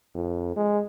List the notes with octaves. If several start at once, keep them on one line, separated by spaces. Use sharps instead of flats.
F2
G#3